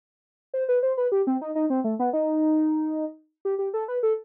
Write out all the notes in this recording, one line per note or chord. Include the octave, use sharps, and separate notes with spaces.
C5
B4
C5
B4
G4
C4
D#4
D#4
C4
A3
B3
D#4
G4
G4
A4
B4
A4